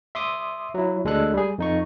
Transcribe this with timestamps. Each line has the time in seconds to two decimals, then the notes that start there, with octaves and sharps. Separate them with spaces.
0.15 E5 C6 D6 D#6
0.74 F#3 E4
1.05 D2 G#3 D4 A4 F#6
1.34 G3 G#4
1.58 F2 D#4 C#6